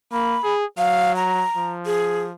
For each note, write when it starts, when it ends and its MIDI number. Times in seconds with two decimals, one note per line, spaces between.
0.12 0.38 58
0.12 0.53 83
0.43 0.65 68
0.78 1.44 54
0.78 1.15 77
1.16 1.71 82
1.56 2.33 53
1.86 2.23 68